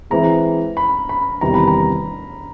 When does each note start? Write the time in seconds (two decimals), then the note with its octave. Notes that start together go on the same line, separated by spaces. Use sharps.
0.10 E3 G#3 C4 E4 G#4 A#5
0.77 B5
1.09 B5
1.41 E2 C3 D#3 G3 A#5
1.54 B5
1.68 A#5